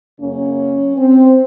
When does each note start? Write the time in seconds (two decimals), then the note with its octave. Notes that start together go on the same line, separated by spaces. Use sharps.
0.20 F#2 C#3 F#3 A#3 C#4
0.97 C4